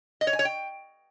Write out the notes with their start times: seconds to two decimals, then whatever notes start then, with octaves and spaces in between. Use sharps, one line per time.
0.21 D#5
0.27 C#5
0.33 G#5
0.39 C#5
0.45 G5